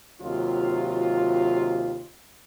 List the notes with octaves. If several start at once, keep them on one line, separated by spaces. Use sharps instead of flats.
D#2 C3 F#3 F4